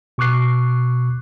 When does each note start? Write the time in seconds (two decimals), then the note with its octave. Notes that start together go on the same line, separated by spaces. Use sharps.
0.18 B2 C#6 D6 F#6 C7